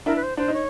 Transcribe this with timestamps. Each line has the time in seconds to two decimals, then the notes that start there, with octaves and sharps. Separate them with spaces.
0.06 D4 E4 A#4
0.16 B4
0.23 C5
0.37 D4 C5
0.48 D#4
0.53 C#5